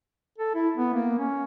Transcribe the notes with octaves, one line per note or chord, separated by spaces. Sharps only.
A4
E4
B3
A#3
C#4